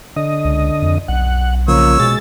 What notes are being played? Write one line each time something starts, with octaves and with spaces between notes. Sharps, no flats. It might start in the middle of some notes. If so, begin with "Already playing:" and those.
D3 D#5
C#2
F2
B1 F#5
C#3 F3 A#3 C#5 E6
B2 G#3 A6